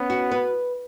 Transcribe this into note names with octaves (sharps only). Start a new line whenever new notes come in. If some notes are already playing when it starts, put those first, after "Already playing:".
Already playing: B3 C#4
F#4
B4